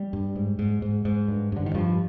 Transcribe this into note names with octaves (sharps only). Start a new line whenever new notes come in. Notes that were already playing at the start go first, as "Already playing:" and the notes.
Already playing: G3
G2
G#2
G#2
G#2
G#2
G2
G2 D3
D#3
G2 F3